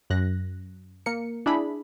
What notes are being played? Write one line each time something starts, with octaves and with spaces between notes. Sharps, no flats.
F#2 F#6 A#6
A#3 A#4 C#7
D4 E4 G#4 B5